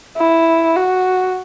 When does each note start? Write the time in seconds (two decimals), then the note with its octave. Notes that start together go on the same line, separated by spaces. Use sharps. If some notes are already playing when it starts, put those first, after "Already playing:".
0.17 E4
0.76 F#4